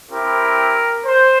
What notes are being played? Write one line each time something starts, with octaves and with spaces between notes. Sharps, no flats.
C4 E4 G4 A#4
C5